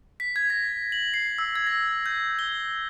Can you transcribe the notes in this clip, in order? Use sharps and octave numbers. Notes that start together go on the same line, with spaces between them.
B6
G#6
A#6
F#7
C7
E6
G#6
A#6
G6
G7